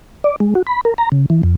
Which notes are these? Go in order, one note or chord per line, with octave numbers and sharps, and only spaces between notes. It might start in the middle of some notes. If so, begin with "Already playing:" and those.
D5
G#3
F#4
B5
A#4
A#5
C#3
E3
F2